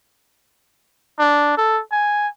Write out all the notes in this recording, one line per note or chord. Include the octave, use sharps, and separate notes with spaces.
D4
A4
G#5